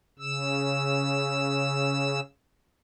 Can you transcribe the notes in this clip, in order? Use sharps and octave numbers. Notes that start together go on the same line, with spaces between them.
C#3 E6